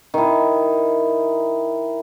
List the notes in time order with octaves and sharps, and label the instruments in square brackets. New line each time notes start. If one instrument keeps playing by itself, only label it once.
[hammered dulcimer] D#3 E4